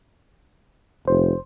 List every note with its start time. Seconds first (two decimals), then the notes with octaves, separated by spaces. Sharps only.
1.08 F1 C5